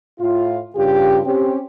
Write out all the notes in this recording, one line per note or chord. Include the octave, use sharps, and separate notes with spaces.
A2 F4
G2 C#3 F4 G4
C4 C#4 G4